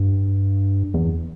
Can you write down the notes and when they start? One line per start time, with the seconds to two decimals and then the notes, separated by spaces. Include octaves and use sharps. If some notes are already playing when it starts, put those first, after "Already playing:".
Already playing: G2
0.94 E2